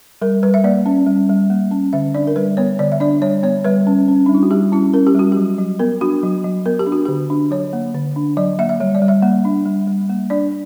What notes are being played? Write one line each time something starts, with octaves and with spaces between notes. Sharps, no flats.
G3 A#4
G3 B4
E5
A#3 D5
C#4
G3
G3
A#3
C#4
D3 E5
D4 D5
A#4
G3 B4
B3 C#5
D3 D5
E5
D4 D5
G3 C#5
B3 C#5
G3 B4
C#4
C#4
G3 D4
E4
F#4
G3 G4
C#4 E4
C#4 A#4
G4
G3 F#4
F#3 G4
F#3
B3 A#4
D4 F#4
F#3
F#3
B3 A#4
G4
D4
F#4
D3 G4
D4
F#3 C#5
A#3
D3
D4
F#3 D5
A#3 E5
E5
G3 C#5
D5
G3
E5
A#3
D4
G3
G3
A#3
D4 D5